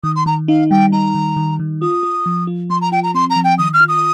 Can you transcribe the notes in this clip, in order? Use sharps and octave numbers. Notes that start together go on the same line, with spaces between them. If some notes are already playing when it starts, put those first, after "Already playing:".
D#3 D#6
C6
D#3 A#5
D#4 F5
G3 G5
D#4 A#5
D#3
D#3
D#3
F4 D#6
F4
F3
F4
F3 C6
A#5
F4 G5
A#5
C4 C6
A#5
F3
G5
D#3 D#6
F6
F4
D#6